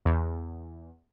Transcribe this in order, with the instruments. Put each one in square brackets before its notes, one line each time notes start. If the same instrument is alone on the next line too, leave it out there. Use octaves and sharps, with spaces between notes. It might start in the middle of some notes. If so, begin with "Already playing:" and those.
[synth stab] E2